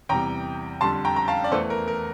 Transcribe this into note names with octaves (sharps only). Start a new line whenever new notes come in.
E2 C3 G3 G5 A#5
F2 D3 G3 A5 C6
G5 A#5
A#5
F5 A5
D5
E2 E3 A3 A4 C5
A#4
A#4